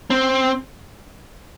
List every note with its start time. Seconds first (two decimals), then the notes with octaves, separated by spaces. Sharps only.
0.10 C4